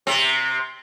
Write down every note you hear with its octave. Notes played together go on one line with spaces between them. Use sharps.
C3 C4